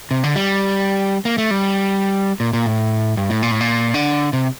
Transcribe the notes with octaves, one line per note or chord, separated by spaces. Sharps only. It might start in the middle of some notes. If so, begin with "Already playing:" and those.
C3
D3
G3
A#3
A3
G3
A#2
A#2
A2
G2
A2
A#2
A2
A#2
D3
C3